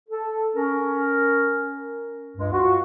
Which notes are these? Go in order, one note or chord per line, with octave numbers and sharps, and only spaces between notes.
A4
C#4 A#4
C#2 G2 G#3
F4 F#4